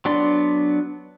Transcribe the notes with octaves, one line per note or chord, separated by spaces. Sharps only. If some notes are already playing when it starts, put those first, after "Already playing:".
F#3 B3 D4 D5 C6